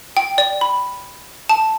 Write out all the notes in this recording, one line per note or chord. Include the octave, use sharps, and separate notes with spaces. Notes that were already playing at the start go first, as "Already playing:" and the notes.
G5
D5
B5
A5